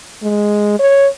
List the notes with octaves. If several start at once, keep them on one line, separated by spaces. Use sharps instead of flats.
G#3
C#5